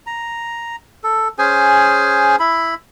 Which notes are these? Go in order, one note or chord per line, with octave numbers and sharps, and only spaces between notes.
A#5
A4
C#4 G#4 C5 G#5
E4 B5